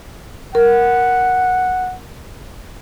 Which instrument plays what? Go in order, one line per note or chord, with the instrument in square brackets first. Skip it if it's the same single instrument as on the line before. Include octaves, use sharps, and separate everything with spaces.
[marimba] A#4 [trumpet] F#5